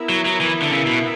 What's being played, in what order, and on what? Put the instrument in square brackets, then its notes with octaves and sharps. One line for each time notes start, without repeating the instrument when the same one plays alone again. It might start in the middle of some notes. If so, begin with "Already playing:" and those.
Already playing: [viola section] B3 E4 A#4 E5
[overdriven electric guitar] F#3
F#3
E3
D3
C#3
B2